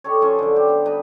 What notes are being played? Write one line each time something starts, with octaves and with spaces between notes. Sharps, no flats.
D#4 G4 A4 C#5
F3 C#4 C6 C#6
D3 F#3 E5
G4
B3
G3 D#4 B4 B5